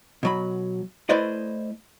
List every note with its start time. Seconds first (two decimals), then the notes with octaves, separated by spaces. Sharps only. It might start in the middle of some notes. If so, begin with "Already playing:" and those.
0.23 B2 F#3 B5
1.09 A3 E4 B4 C5 D5 D#5